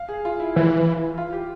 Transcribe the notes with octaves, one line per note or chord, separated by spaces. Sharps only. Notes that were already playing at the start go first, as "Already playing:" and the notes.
Already playing: F5
G#4
F4
E4
E3 E4
F4
G4